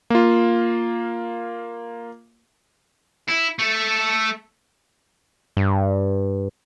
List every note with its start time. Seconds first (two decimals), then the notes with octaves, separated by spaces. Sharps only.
0.10 A#3 F4
3.28 E4
3.59 A3 A4
5.57 G2